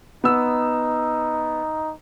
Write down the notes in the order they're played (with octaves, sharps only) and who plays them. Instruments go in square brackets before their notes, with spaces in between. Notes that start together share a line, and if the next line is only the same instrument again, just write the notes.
[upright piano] B3 E6 [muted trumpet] D#4